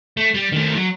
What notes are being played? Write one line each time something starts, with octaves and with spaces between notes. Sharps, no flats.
A3
G3
D#3 A3
F#3